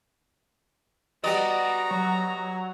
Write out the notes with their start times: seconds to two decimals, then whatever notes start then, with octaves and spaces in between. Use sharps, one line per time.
1.24 G3 B3 F#4 D5 D#5 A#5
1.91 F#3